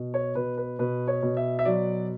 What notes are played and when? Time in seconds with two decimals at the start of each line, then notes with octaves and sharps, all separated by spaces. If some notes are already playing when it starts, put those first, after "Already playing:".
Already playing: B2
0.14 C#5
0.35 B2 B4
0.57 B4
0.79 B2 B4
1.08 C#5
1.22 B2
1.37 E5
1.59 E5
1.65 F#3 D5